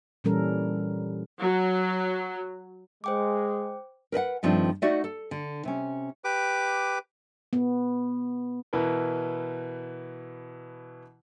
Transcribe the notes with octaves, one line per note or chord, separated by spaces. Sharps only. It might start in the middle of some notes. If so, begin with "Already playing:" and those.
A#2 E3 G3 C#4 A4 A#4
F#3
G#3 C5 G5 D6
A#4 B4 D#5 F#5
G2 D#3 F3 A3 C4 D4
A3 D#4 F#4 D5 E5 F#5
A4
D3
C3 C#4
G4 B4 D6
B3
B2 E3 E4 A#4 B4